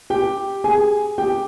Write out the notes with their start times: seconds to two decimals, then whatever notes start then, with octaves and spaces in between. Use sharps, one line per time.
0.10 G4 G5
0.64 G#4 G#5
1.18 G4 G5